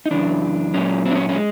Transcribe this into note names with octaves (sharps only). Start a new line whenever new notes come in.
D#4
F#2 C#3 E3 D4
A#2 F#3 C#4
C4
D4
C#4
C#4
G#3